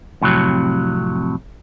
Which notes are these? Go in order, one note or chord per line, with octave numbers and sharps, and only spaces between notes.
F2 A2 C3 F#3